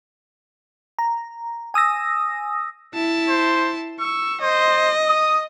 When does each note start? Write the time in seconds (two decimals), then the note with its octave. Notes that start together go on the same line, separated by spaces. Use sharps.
0.99 A#5
1.74 G#5 D#6 E6 A#6
2.95 E4 A5
3.29 C5
4.00 C#6 E6
4.41 C5 D#5
5.09 D#6